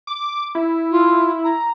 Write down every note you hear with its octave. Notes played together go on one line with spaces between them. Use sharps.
D6
E4
F4
A#5